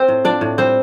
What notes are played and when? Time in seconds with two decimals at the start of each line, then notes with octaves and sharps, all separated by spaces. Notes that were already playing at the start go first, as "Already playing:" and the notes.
Already playing: C4 C5
0.08 A2
0.24 F3 D4 D5
0.41 A2
0.58 G3 C4 C5